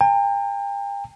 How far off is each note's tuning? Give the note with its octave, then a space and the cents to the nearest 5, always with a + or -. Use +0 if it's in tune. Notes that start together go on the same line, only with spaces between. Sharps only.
G5 +40 A#5 -45